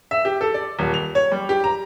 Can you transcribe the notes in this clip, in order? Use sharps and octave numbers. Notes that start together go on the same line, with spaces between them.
E5
G4
A4
D5
D#1
F7
C#5
G3
G4
A#5